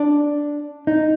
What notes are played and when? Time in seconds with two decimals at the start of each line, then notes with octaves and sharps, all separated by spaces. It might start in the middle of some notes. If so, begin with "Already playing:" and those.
Already playing: D4
0.87 D#4